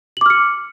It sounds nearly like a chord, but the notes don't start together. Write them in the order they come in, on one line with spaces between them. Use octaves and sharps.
F#7 D6 F6 C#7